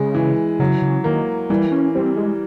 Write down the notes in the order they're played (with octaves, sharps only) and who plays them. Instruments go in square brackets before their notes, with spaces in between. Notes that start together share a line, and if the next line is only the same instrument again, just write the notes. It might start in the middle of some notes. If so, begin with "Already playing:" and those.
Already playing: [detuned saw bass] C#3 [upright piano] G#3
[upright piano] E3
[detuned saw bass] C#3 [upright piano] F#3
[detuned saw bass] C#3
[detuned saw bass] D#3 [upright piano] A#3
[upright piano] E3 [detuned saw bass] G3
[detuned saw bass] C#4
[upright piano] G3 [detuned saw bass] C4
[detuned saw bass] G#3